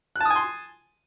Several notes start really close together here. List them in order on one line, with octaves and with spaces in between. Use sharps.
F#6 A5 D#6 G#5 C6